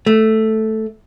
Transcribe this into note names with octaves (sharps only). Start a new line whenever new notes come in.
A3